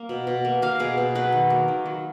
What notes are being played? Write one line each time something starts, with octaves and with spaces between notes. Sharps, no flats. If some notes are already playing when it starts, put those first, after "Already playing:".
Already playing: A#3
B2
B2
A#3
A#3 F5
B2 G#4
B2
F#3 B4
D#3
A#3
D#3
F#3